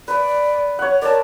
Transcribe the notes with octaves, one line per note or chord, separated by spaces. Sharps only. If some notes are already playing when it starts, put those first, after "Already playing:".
B4 D5
C#5 F#5
A#4 D5 A5